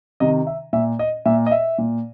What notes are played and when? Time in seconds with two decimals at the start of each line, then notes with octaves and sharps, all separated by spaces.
0.20 C3 D#3 D#5
0.47 E5
0.73 A#2 E5
0.99 D#5
1.25 A#2 E5
1.46 D#5
1.51 E5
1.78 A#2